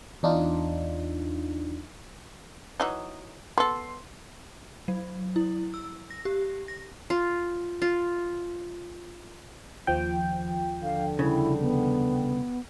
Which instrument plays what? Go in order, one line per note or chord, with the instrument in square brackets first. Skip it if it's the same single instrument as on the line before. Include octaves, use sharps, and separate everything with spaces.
[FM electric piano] E2 D4 D#4 F4
[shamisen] E3 F#3 D#4
[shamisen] B3 A4 [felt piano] C6
[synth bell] F#3
E4
E6
A#6
G4
A#6
[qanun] F4
F4
[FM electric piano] D#2 F3 G5
[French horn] D3 [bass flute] F5
[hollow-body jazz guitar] C2 C#3 [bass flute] E4
[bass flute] B3